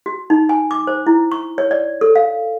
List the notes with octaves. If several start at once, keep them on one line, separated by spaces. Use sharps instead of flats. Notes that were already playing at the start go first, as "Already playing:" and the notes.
F#4
D#4
G#5
D6
C5
E4
C#6
C#5
D5
A4
F5